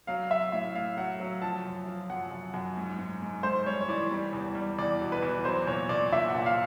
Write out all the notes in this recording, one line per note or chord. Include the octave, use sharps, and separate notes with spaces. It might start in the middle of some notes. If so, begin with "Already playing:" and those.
F#3 F5
F#3 E5
A2 E5
A2 F5
F#3 F#5
F#3
F3 A5
F#2
F3
F#2 F#5
F#2
F#2
G#2
G#2
G#2
G#2 C5
G3 C#5
C#5
E3 D5
G3
E2
G3
E2 D5
B2
B4
E2
F#3 C5
A#2 C#5
A#2 D5
A#2 E5
F#5
A#2
F5